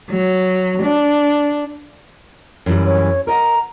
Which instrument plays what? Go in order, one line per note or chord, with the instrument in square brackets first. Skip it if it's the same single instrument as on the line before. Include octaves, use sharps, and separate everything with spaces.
[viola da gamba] F#3
D4
[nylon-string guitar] F#2 E3 G3
[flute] C#5
[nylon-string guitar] A#4 D#5 F#5 [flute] A#5